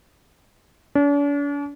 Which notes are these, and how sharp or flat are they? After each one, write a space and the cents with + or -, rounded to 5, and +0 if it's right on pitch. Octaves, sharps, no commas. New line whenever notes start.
D4 -45